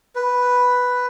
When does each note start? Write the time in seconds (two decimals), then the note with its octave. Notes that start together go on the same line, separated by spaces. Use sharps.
0.16 B4